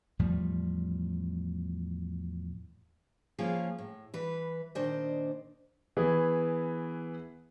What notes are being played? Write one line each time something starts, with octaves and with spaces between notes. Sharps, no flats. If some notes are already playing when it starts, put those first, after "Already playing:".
E2 A2 F3 G3
F3 A#3 C#4 F4 G#4
A2
E3 B4
A#2 D#3 D4 C5 D#5
E3 B3 G#4